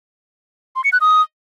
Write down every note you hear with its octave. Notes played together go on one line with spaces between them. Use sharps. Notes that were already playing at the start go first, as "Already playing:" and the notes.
C6
C#7
F#6
D#6